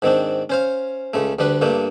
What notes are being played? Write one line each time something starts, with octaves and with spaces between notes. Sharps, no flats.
G#2 D#3 C4 D4
C#4 C5 F5
C#2 C#3 A3
D2 G3 D4 B4
G2 A3 A#3 D4